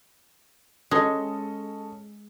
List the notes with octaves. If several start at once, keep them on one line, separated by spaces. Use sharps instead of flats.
G#3 C#4 A4 D#5